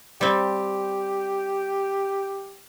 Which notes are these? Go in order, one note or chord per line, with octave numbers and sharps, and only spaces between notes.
G3 C4 G4